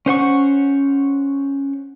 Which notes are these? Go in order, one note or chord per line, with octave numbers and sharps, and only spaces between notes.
C#4 C5 F#5 C#6